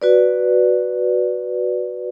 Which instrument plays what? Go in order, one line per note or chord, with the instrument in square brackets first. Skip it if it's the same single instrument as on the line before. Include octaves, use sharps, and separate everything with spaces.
[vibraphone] F#4 B4 D5